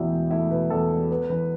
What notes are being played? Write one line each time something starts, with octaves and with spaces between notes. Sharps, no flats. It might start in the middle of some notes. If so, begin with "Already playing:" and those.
Already playing: E2 B2 A3 E4 E5 G5
E1
A3 E4 E5
B2 B4
E2 A4
E1
B3 B4
E3 B4